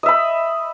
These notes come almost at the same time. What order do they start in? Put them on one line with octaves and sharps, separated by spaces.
D#5 E5 B5